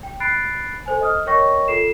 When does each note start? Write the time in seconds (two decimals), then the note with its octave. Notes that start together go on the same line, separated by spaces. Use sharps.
0.03 G5
0.20 B5 F#6 A6 C7 D7
0.86 A4 C5 G#5
1.01 D#5 D#6 F6
1.26 A#4 C#5 D#5 G5 C#6 A#6
1.68 F4 A4 C7 E7